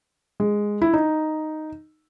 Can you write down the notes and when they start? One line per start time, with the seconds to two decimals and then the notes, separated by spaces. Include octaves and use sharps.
0.40 G#3
0.82 E4
0.94 D#4